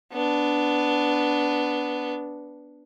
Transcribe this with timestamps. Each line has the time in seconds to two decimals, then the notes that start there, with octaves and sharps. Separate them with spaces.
0.13 B3 D4